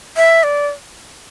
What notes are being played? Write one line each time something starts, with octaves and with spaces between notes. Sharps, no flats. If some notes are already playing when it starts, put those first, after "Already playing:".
E5
D5